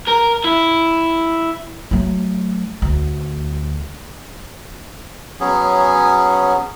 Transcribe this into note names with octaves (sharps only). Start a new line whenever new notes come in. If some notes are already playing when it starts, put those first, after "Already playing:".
A#4
E4
F#3 A3
D2
F#3 B3 C#4 G#4